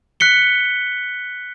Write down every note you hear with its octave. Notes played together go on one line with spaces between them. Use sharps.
F#6 B6 C#7 G7